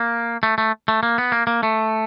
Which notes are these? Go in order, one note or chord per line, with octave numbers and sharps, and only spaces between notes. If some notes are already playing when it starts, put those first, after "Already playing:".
Already playing: A#3
A3
A3
A3
A#3
B3
A#3
A#3
A3